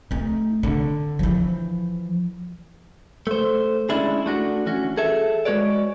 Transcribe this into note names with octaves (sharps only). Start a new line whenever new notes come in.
A3 D#4
D3
E3 F3
A3 C5
G#3 A3 C#4 D4 E4 G#4
A3 D4 F#4
E3 C#4 F#4
G#4 A4 E5
G#3 C#4 F#4 B4 C#5 D5